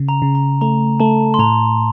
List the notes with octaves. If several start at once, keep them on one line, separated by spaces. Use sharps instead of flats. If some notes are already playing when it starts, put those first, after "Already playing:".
Already playing: C#3
A#5
C#3
A#5
A3 A#5
A3 A5
C6
A2 A#5